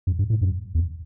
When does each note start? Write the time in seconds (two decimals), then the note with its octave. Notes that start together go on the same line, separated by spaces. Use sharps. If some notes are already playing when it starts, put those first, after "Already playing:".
0.07 F#2
0.19 G2
0.30 A2
0.41 F#2
0.75 E2